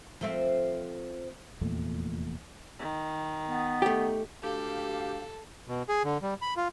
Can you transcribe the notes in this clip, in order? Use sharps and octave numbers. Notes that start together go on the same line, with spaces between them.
F3 A3 C4
F1 E2 A#2 A3
D#3
B3
A3 G4
D2 G4 A4 F5
B2
G#4
D3
G3
B5
F4